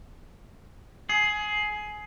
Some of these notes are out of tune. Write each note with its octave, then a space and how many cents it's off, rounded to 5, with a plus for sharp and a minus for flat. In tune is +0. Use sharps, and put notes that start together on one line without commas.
G#4 +20